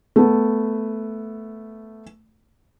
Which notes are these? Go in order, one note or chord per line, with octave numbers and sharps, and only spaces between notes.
A3 B3